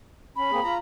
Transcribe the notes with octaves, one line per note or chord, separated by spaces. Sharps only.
C#4 B5
A#3 C4 G#4
F4 A#5